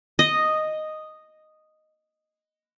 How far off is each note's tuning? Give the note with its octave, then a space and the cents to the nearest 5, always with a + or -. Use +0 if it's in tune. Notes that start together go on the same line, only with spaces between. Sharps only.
D#5 -5